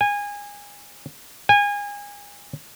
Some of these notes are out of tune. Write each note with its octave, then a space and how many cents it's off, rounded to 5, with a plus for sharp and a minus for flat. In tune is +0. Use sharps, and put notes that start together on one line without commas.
G#5 -20
G#5 -25